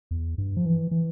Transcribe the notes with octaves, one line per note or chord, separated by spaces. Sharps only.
E2
G2
F3
E3
E3